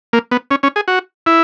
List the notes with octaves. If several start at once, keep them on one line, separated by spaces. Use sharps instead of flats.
A#3
B3
C#4
C#4
G#4
F#4
E4